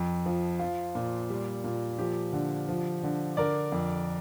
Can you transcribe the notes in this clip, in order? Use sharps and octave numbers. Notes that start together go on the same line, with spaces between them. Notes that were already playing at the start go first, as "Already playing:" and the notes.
Already playing: F2
F3
F3 F4
A#2
G3
A#2
F3 G4
D3
F3
D3
D3 A#4 D5
F2